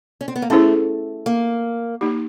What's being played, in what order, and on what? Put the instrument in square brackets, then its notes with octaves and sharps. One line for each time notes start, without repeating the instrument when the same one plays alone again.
[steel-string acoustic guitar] C#4
C4
B3
A#3
[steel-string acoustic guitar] A3 [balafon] C#4 E4 G#4 C5
[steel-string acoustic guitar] A#3
[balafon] A#3 D#4 G4